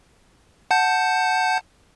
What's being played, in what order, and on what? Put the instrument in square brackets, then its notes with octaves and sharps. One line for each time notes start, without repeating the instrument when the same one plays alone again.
[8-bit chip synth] F#5 A5 G6